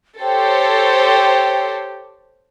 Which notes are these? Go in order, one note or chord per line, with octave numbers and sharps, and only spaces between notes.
G4 A4 C5 C#5 G5